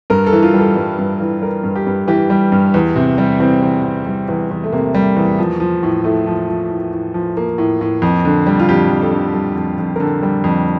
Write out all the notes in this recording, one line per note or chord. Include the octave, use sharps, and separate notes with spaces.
G2 A#4
A4
E3
F4
G3
A4
G2
G2
E3
G3 A#4
G2
G4
G2
E3 G4
G3
G2
E2
C3
G3
E2 C4
E2
C3
G3
E2
E2
A3
C3 A#3
G3
E2
F3
F3
A2
A2 A3
F3
F3
A2
A2
F3
F3 A#3
A2
A2
F2
D3
G3
F4
F2 G4
F2
A4
D3
G3
F2
F2
A#4
D3 A4
G3
F2